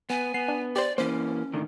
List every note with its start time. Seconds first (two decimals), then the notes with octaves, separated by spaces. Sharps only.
0.10 B3 G#5
0.34 B3 C7
0.48 D4
0.76 G4 C5 D5
0.98 E3 A#3 C#4 C5
1.54 A2 D3 D#3